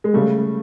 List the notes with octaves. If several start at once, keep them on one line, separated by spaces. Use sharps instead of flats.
G#3
C#3 G3 A3